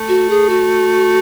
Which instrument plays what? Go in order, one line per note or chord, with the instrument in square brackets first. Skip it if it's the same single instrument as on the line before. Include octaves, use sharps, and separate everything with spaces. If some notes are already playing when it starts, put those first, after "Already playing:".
Already playing: [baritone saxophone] A3
[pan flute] F#4
G#4
F#4